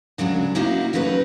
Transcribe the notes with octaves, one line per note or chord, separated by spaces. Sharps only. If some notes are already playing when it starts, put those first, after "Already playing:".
D2 C#3 F#3 G#3 D4
A#3 D#4 E4 F#4 D#5 F5
E2 C#3 F#3 A3 D#4 B4